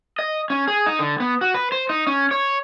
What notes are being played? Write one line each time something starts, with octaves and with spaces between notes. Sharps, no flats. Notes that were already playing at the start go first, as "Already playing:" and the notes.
D#5
C#4
G#4
D#4
D3
B3
F#4
B4
C5
D#4
C#4
C#5